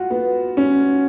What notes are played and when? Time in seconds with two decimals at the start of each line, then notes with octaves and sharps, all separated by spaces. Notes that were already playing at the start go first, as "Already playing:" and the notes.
Already playing: F4 F#4
0.10 B3
0.57 C#4